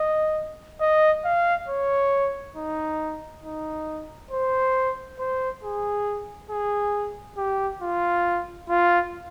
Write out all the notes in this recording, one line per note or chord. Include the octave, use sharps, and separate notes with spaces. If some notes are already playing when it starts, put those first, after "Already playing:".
Already playing: D#5
D#5
F5
C#5
D#4
D#4
C5
C5
G#4
G#4
G4
F4
F4